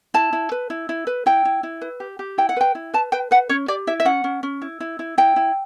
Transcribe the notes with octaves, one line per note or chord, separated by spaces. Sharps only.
E4 A5
E4
B4
E4
E4
B4
E4 G5
E4
E4
B4
G4
G4
E4 G5
F#5
B4 G5
E4
B4 A5
B4 G5
B4 F#5
C#4 C#5
G4 D5
E4 E5
E5
C#4 F#5
C#4
C#4
E4
E4
E4
E4 G5
E4